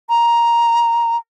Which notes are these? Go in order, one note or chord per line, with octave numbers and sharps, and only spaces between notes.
A#5